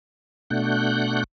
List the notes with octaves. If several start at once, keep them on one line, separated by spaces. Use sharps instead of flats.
B2 A3 D4 F#5 F#6 G6